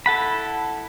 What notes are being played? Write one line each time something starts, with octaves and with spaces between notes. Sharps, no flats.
E4 A4 F#5 B5